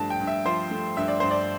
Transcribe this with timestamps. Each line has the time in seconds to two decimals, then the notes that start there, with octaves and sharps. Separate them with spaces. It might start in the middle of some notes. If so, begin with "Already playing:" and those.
Already playing: G2 F3 A3 A5
0.10 G5
0.20 G2
0.27 E5
0.45 F3 C5
0.71 A3
0.97 G2 E5
1.08 D5
1.20 G2 C5
1.31 D5